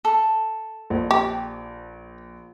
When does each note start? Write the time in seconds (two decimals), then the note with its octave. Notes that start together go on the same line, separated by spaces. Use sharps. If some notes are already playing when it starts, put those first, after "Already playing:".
0.05 A4
0.90 A#1
1.11 G4